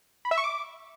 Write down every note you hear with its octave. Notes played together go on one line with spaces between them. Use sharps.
B5
E5
C#6
D6